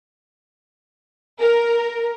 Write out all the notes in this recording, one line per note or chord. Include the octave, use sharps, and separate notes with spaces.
A#4